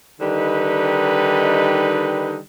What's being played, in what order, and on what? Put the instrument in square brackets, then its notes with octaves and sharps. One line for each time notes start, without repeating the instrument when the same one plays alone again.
[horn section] D3 D#3 G3 D#4 B4